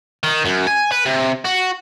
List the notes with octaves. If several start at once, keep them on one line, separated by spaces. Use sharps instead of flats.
D#3
F#2
G#5
B4
C3
F#4